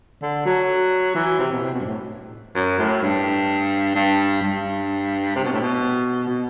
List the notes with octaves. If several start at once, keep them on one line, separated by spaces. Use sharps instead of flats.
D3
F#3
E3
C3
B2
C3
B2
G2
A2
F#2
A2
G2
G2
G2
C3
B2
A2
B2
B2